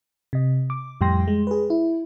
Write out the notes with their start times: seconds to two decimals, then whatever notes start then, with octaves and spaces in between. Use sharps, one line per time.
0.33 C3 D#5
0.70 D6
1.01 F2 A2 G3 G5 C6 A#6
1.28 G#3
1.47 G#4 B4
1.70 E4